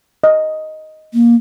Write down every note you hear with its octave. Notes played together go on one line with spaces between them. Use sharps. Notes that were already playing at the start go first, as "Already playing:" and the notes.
D#5
A#3